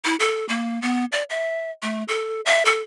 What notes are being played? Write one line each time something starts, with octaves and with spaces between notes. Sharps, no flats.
E4
A4
A#3
B3
D5
E5
A3
A4
E5
A4